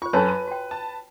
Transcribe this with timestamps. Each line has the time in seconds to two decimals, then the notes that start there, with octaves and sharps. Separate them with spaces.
0.02 F4 C5 C#6
0.13 F#2 A4 B4 C#5 G#5 A5
0.29 D#7
0.48 F#4 G5
0.71 A5